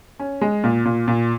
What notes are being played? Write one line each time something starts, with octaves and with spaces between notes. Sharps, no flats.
C#4
G#3
A#2
A#2
A#2